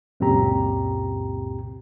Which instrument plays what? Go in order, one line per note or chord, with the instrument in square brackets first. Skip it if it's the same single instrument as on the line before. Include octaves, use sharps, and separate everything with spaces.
[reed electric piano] C#2 F#2 A#2 C4 G4 A#5